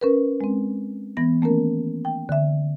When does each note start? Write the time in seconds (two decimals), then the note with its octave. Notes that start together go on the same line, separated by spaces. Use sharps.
0.01 C#4 A#4 B4
0.41 G#3 C4
1.17 E3 B3 A#6
1.41 D#3 A3 A#3 C#4 A#4
2.05 G5
2.29 D3 E5